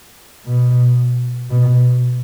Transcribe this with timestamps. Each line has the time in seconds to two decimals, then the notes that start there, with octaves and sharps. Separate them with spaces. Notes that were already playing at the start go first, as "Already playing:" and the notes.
0.45 B2
1.50 B2